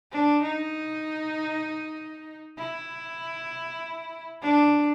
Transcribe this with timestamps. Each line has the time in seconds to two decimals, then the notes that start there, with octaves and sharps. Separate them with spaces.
0.12 D4
0.42 D#4
2.58 E4
4.42 D4